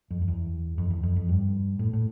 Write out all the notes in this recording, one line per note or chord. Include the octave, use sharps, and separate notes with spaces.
F2
F2
E2
F2
E2
F2
F2
G2
A2
A2